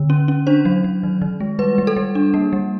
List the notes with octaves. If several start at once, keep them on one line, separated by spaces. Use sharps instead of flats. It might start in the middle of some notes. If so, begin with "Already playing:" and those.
Already playing: D3
C#4
C#4
D4 C5
F#3
F#3
D#3
D#3
G#3
G3 B4
G3
A4
G3
D4
A#3
G3